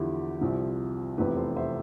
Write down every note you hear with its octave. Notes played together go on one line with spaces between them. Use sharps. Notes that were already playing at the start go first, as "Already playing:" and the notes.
Already playing: E2 D3 F3 E4 G4
C2 C3 F3
F1 E2 C3 F3 G4 B4
A4 C5
C5 E5